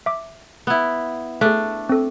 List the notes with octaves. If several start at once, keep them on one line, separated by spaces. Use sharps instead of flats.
E5 D6
B3 E4
A3 D4 G#4 E5
C4 A4